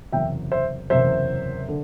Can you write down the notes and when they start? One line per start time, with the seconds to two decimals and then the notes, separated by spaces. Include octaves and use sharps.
0.12 F#1 E2 C3 F#3 E5 G5
0.52 C5 E5
0.90 F#1 E2 C3 F#3 C5 E5
1.68 D3